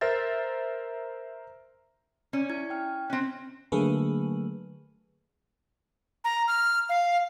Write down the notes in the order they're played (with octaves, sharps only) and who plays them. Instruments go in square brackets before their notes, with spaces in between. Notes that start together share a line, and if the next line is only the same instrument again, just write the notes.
[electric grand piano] A#4 C5 E5 A6
[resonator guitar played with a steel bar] C#4 [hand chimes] D5
[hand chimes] E4 G#6
G5 F6
[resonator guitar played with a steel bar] C4 C#4 [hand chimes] F#6
[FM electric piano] D3 F#3 A3 A#3 G#4 B4
[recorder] A#5
F6
F5